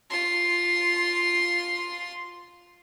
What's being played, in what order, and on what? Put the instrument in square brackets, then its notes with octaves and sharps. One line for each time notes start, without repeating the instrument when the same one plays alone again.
[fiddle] F4 C6